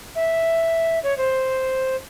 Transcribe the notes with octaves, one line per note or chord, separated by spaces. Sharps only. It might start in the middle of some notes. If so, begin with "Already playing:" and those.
E5
C#5
C5